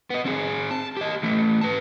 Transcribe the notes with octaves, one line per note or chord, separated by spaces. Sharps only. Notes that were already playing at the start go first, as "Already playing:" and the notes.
B3 D#5
C4 G#4
A5
G4 D#5
E3 A3
B4 A5